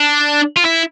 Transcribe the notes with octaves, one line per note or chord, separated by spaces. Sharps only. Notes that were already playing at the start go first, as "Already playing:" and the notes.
Already playing: D4
F4
E4